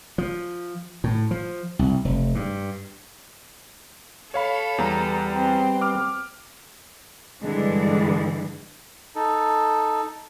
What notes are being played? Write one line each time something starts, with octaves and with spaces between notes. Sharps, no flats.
F3
A2
F3
C2
F1
G2
A4 C#5 F5 B5
E2 G3 B3 A#5
C4
D6 F6
G2 D3 E3 G3 G#3 D4
D#4 A4